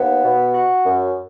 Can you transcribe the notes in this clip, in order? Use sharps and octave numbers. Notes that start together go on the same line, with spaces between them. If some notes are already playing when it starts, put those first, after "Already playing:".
Already playing: D#2 B3
B2
F#4
F#2